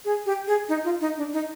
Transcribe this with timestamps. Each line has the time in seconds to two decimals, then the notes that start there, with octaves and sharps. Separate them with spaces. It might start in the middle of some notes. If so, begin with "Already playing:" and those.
0.05 G#4
0.26 G4
0.47 G#4
0.69 D#4
0.84 F4
1.01 D#4
1.17 D4
1.33 D#4